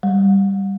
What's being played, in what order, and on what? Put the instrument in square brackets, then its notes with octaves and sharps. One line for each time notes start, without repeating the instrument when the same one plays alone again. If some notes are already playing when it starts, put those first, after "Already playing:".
[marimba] G3